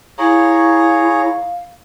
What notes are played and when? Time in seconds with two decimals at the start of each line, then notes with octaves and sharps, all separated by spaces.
0.19 E4 G#4 C#5 F5 A#5